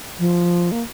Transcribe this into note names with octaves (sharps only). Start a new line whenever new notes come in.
F3
A#3